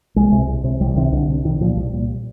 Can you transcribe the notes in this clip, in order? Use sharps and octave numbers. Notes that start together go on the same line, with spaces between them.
C2 G#3
C3
C2
C3
C2 G3
C3 D#3
C2 D3
C3
C2 D#3
A#2 F3
C2 G3
A#2